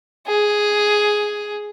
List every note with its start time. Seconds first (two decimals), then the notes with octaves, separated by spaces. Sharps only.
0.27 G#4